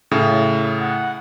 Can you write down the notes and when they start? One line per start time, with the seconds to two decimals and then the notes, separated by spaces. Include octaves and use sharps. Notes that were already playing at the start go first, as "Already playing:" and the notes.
0.11 A2 C#3
0.81 F#5